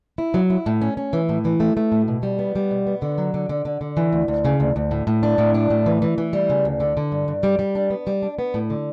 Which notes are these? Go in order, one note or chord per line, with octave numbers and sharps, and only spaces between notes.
E4
F#3
E4
A2
C#4
C#4
E3
A2
E3
A3
A3
A2
B2
G3
B3
G3
B2
B3
D3
F#3
D3
D3
D3
D3
E3
D2
D2
C#3
D2
D2
A2
A2
D4
A2
D4
A2
E3
E3
E3
G3
C#3
D2
D3
D3
G2
G2
G3
G3
D4
B3
G3
D4
B3
A2
D3